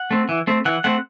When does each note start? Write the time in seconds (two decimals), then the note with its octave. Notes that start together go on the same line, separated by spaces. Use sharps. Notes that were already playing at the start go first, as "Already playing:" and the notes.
Already playing: F#5
0.11 A3 C4
0.29 E3
0.47 A3 C4
0.65 E3 F#5
0.84 A3 C4 F#5